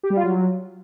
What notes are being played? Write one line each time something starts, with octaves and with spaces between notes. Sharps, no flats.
G4
G3
F4
F#3